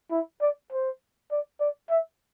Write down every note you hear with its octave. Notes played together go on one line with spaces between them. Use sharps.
E4
D5
C5
D5
D5
E5